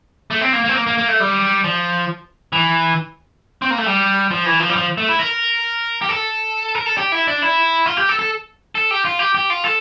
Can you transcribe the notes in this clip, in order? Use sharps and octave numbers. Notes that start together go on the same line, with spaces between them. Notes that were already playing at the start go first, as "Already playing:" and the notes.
A3
C4
A#3
A#3
C4
A#3
A#3
A#3
A3
G3
F3
E3
C4
A#3
A3
G3
F3
E3
F3
G3
F3
A3
E4
A#4
G4
A4
A#4
A4
G4
E4
D4
E4
F4
G4
A4
A4
A4
G4
F4
G4
G4
F4
A4